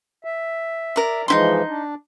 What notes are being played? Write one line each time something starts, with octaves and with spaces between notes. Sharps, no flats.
E5
A#4 D5
E3 F3 G#3 D#4 E4 C6
D4